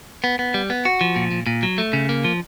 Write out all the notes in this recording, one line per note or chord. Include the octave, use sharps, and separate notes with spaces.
B3
B3
G3
B3
F#4
F3
A#2
A#2
A#2
F#3
A3
C#3
A#3
F3